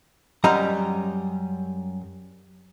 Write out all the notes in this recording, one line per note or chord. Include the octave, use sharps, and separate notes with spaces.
F#2 G3 D#5 A#5